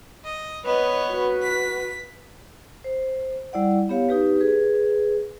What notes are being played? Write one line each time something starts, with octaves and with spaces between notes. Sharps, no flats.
D#5
B3 B4 C#5 D#5
F#4 B4
B6
C5
G3 E4 D5 F#5
B3 G4 C#5 F5
D#4 G4 B4
G#4 B4